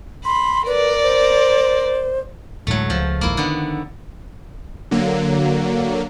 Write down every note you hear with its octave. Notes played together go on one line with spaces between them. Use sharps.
B5 C6
A#4 B4 D5
C5
D2 A2 F#3 G#3 A3
C#2 F3
A#1 D#2 G#2 A#3 E4
D3 D#3 B3
D3 F#3 A#3